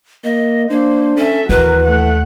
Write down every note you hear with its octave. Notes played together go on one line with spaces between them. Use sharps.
A#3 D#5
A#3 D4 C5
C#4 A4 E5
D#2 E3 F#4 A#4 B4
A3 F#5